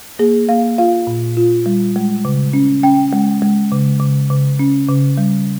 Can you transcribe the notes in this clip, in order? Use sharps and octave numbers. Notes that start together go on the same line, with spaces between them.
A#3 G#4
A#3 F5
F4 F5
A#2
F4
G3
G#3
C#3
C#4
C#4 G5
G#3
G#3
C#3
C#3
C#3
C#4
C#3
G3